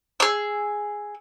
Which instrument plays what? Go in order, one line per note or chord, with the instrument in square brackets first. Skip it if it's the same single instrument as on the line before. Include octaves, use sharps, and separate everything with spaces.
[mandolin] G#4 E6